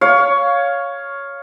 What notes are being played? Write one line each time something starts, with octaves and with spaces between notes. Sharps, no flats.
C#5 F5